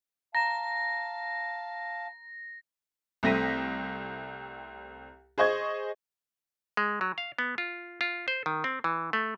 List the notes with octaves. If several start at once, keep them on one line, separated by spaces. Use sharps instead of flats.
F5 A5 A#5 A#6 E7
C2 A3 C4 A#6 B6 D#7
G#4 C5 D#5 C#6 G#6
G#3
F#3
F5
B3
F4
F4
C5
D#3
C4
E3
A3